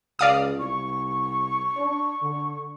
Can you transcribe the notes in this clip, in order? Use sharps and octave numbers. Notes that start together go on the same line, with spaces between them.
C#2 D5 F5 D#6
C2 C#6
D4
D3